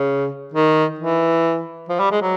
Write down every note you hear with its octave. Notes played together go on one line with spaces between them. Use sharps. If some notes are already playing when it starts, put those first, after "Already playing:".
Already playing: C#3
D#3
E3
F3
G3
G#3
F#3